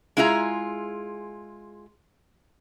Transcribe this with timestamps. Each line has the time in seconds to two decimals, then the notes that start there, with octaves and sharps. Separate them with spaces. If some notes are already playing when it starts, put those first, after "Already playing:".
0.17 G#3 E4 F4 G#4 A#5